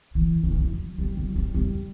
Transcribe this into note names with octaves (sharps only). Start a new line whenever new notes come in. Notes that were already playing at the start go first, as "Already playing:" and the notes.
E3
F#3
E3
F#3
G3
F#3
G3
G3